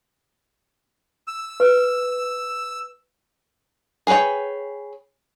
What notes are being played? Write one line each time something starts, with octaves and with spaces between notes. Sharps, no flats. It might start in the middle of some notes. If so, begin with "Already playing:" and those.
E6
B4
G#4 A#4 B4 C#5 G5